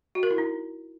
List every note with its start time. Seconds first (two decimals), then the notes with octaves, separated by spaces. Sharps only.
0.15 F#4
0.23 A#4
0.31 E4
0.38 D#4